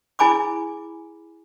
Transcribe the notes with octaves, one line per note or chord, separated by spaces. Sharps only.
E4 G#4 G#5 B5 D6